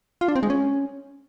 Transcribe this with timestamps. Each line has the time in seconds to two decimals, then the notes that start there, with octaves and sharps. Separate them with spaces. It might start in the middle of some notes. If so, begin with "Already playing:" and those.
0.21 F4
0.28 D4
0.36 C4
0.43 G#3
0.50 C#4